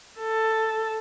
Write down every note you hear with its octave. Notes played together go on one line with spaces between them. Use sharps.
A4